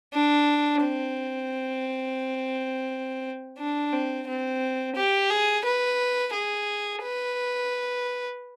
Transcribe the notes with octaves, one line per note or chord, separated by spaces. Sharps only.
D4
C4
D4
C4
C4
G4
G#4
B4
G#4
B4